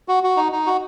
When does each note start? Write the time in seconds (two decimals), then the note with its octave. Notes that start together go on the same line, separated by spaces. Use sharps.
0.08 F#4
0.23 F#4
0.37 D#4
0.52 D#4
0.66 F#4